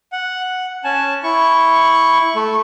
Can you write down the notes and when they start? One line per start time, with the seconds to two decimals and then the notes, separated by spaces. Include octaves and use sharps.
0.12 F#5
0.84 C#4 G#5 A5
1.23 E4 C#6
2.35 A3